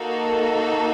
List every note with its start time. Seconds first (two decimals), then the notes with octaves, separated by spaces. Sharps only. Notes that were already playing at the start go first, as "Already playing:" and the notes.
Already playing: A#3 D#4 F#4 A4